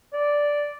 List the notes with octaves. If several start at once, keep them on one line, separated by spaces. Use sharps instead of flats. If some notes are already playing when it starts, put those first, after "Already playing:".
D5